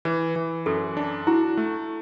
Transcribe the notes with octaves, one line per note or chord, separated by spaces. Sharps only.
E3 B4
E3
F#2 A4
D4
E4 F#4
A3